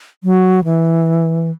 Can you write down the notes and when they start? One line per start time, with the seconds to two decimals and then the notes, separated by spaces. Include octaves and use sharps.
0.24 F#3
0.64 E3